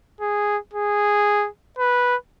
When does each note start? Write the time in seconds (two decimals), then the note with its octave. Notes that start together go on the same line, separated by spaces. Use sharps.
0.21 G#4
0.74 G#4
1.79 B4